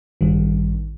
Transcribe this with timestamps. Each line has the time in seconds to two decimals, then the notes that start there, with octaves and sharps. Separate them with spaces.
0.21 A1 G2 D#3 G3